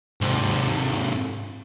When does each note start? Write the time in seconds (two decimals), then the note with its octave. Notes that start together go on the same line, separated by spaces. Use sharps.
0.21 G#2 C3